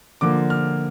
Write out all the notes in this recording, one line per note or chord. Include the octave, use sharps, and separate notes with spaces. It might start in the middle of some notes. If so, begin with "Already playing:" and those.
D3 F3 A#3 D6
F6